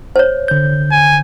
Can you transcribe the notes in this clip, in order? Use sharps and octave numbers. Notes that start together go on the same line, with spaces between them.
C5 C#5
D3 G6
G#5